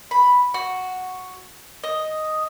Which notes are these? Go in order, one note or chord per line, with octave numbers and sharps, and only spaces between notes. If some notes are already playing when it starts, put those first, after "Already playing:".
B5
F#4
D#5